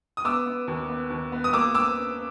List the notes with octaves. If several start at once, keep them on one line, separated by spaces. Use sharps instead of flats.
D#6
B3 D6 E6
B3
D#2
B3
D#2
B3
D#6
A#3 D6 E6
D6 E6